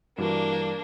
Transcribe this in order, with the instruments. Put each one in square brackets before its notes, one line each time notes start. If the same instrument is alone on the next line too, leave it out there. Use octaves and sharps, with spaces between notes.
[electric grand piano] G2 E3 F#4 [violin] A#3 D4